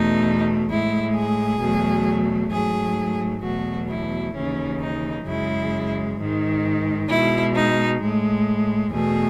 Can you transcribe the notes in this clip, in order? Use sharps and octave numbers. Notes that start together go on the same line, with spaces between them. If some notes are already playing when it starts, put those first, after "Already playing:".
Already playing: E2 B2 A3 D#4
A2 G#3 E4
G#4
E2 B2 F#3 A3
G#2 F#3 A3 G#4
E2 B2 F#3 A3 F#4
E4
D#2 C#3 E3 C#4
D#4
F#2 C#3 G#3 E4
G#2 D#3 G#3
B2 G#3 E4
D#4
A2 G#3
E2 B2 A3 G#4